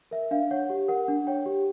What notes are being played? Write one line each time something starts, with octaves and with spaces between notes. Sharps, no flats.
A#4 E5
D4 F5
C#5 F#5
G4
A#4 F#5
D4
C#5 G5
G4